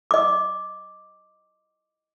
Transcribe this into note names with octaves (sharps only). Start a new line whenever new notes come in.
D#5 D6